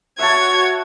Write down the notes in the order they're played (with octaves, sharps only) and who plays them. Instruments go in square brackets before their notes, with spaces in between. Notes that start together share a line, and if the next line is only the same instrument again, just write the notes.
[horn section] F#4 [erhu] C#5 [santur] E5 A5 [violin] G#6